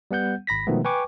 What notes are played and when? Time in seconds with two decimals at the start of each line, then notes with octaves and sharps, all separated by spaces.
0.11 G3 B3 F#5 G6
0.47 G#1 B5 A#6 B6
0.67 B2 D#3 F3 G#3 A3 B3
0.85 B4 G5 G#5 C#6 D6